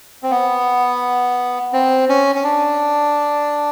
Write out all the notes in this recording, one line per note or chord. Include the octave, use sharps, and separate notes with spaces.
C4
B3
C4
C#4
C#4
D4